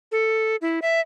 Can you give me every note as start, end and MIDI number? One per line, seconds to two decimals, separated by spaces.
0.12 0.56 69
0.62 0.79 64
0.82 1.01 76